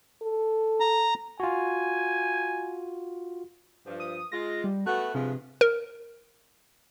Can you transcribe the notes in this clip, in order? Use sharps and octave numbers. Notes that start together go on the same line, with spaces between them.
A4
A#5
F4 F#4 G#5
G2 F3
D#6
G#3 F4 A#6
G3
A3 B3 F#4 F#6
G2 C3 F3 G#3
A#4